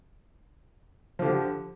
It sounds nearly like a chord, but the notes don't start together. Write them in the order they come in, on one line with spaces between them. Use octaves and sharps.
F3 D3 G4